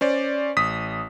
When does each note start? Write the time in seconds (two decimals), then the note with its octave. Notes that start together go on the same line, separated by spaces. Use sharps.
0.01 C#4 C5 D5
0.57 A1 D#6 B6